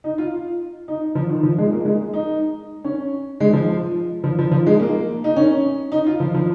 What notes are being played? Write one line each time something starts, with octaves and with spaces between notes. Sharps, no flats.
D#4
F4
D#4
F3
D#3
F3
G#3
A#3
G#3
D#4
C#4
G#3
F3
F3
F3
F3
G#3
A#3
D#4
C#4
D#4
F4
F3
F3